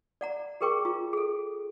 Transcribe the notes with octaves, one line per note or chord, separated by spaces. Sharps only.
D5 F#5 A#5
G4 G#4 A#4 G5 C#6 D6
F4
G#4 A4